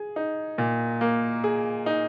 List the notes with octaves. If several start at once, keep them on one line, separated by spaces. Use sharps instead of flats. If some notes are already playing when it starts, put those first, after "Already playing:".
Already playing: G#4
D#4
A#2
A#3
G#4
D#4